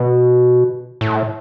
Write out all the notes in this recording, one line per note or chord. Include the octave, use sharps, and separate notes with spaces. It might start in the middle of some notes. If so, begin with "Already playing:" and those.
Already playing: B2
A2